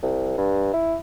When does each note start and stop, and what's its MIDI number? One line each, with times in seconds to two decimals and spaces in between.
0.03 0.33 36
0.38 0.70 43
0.73 0.96 64